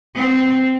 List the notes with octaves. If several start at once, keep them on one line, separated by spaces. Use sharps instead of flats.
C4